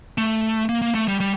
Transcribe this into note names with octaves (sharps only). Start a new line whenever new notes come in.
A3
A#3
A#3
A3
G3
G3